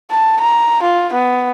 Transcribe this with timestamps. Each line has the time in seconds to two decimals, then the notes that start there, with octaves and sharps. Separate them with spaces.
0.10 A5
0.40 A#5
0.82 F4
1.13 B3